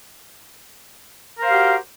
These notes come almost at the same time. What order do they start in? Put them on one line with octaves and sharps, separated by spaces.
A#4 C5 F5 G4 F#4